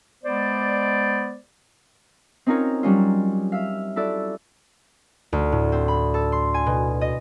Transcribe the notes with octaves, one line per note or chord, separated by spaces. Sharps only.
G#3 B3 C5 D5
C4 C#4 D#4 F4 A#4 C#5
F#3 G3 C#4 F4
E5 F5
E4 F#4 A4 D5
D2
A2
C4
B5
A4
C6
G#5
B2
D#5